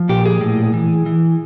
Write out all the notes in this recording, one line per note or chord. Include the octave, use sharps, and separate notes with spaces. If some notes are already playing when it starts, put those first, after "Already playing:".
Already playing: F3
A#2 G4
G#4
A2
E3
E3